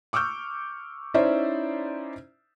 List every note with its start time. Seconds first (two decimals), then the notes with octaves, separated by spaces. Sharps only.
0.13 C#6 D6 E6 F6 G6
1.14 C#4 D#4 E4 C5 D5 E5